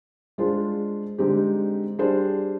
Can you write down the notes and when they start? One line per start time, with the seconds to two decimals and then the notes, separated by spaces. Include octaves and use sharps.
0.38 G#3 D4 F4 G#4 C5
1.18 D3 G#3 C4 D#4 G4
1.99 G3 D4 G#4 C5